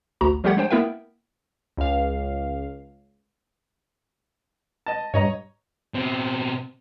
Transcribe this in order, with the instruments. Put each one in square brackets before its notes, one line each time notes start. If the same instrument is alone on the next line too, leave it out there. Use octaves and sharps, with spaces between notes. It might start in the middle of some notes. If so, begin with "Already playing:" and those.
[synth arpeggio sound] A1 D2 F#4 A#5
F3 G3 A3 G4 F#5 G#6
G#3 D4 C5 G5
A#3 B3 E4 A#4 E5 G5
[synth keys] C#2 F5
[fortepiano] D#5 A5
[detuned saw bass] G2 [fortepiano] C#5 D#5 A#5
[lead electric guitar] B2 C4